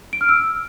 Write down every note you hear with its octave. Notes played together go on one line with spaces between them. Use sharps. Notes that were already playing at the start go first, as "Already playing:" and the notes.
D7
F6
E6